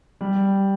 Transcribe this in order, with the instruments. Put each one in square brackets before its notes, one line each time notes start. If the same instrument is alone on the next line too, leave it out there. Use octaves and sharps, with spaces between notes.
[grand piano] G3